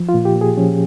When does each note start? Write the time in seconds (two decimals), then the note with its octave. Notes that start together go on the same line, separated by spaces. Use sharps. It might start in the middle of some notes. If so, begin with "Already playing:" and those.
Already playing: F3
0.09 F4
0.14 A#2
0.25 G4
0.36 A#2
0.41 G#4
0.57 F3 C#4